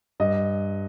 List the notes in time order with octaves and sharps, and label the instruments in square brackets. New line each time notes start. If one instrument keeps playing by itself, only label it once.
[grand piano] G2 D#5